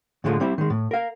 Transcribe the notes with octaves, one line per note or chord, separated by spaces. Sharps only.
A2 D3 F#3 G#3 A3 F4
G3 C4 E4
D#3 G#3
A2
A#4 F5